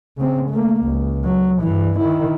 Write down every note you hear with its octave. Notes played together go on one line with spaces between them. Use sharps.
C#3 C4
A3 A#3
C#2
F#3
G2 E3
D#3 E4